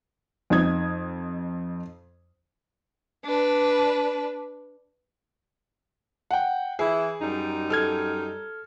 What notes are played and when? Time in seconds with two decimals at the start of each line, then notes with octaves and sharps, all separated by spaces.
0.50 F2 D#4 D#6 G#6
3.25 D4 B4
6.31 F#5 G5
6.79 E3 E4 G#4
7.21 F#2 G3 D#4
7.70 A4 F6 G#6